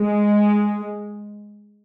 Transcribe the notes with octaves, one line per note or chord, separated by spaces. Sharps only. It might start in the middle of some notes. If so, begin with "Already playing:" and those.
Already playing: G#3